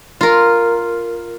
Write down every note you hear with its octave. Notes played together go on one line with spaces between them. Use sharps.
F4 A#4